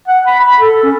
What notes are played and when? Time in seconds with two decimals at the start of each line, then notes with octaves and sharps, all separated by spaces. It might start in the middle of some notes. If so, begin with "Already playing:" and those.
0.08 F#5
0.26 B5
0.40 B5
0.60 A4
0.83 C#4